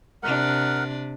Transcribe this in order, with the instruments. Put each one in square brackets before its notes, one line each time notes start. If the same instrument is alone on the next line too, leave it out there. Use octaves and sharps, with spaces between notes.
[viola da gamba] C3 D4 [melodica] A#4 F#5